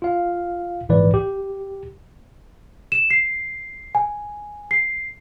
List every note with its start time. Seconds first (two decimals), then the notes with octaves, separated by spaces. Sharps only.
0.02 F4 F5
0.89 A#1 G#2 E3 B4 D5
1.14 G4
2.92 E7
3.10 C7
3.95 G#5
4.71 C7